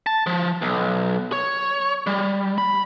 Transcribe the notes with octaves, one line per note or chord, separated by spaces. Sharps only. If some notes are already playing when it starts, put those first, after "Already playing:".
A5
F3
B1
C#5
G3
B5